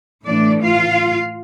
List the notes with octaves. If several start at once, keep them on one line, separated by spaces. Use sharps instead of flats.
A2 E3 A3 D4 D5
F4 F5